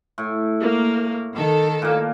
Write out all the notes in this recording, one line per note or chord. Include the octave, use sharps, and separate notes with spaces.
A2
A#3
D#3 A4
A#2 A#3